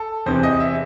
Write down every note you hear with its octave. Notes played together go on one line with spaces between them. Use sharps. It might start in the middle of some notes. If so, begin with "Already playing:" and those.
Already playing: A4
E2 C3 E3 C5
D#5
E5